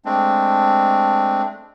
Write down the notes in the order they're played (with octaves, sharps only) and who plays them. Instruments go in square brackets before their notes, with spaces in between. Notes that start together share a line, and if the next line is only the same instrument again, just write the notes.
[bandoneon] G#3 A3 C4 D4